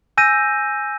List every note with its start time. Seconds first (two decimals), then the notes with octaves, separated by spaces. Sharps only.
0.17 G#5 E6 G6 A#6 D#7